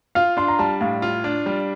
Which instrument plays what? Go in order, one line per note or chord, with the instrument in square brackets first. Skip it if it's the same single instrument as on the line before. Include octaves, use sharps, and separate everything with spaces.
[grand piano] F4 [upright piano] F5
[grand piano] D4 [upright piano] C6
[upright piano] A#5
[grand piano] G3 [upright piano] A5
[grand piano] A2 [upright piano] F5
[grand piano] F4
D4
G3